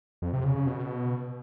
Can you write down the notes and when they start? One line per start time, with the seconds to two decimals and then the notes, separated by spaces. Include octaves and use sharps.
0.22 F2
0.33 C3
0.44 C#3
0.55 C#3
0.67 B2